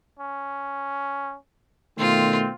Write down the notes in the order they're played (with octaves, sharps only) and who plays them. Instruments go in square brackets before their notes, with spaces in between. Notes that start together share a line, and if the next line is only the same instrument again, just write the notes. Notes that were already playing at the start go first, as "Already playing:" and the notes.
[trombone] C#4
[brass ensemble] B2 D#3 A3 [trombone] C4 [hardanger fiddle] F4